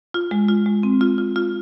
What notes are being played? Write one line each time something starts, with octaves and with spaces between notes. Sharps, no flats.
F4
G#3
F4
G#3
C4
F4
F4
F4